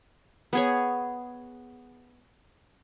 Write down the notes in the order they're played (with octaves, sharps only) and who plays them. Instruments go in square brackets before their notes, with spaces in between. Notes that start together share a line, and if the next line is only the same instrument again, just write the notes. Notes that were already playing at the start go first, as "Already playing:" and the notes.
[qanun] B3 G#4 C#5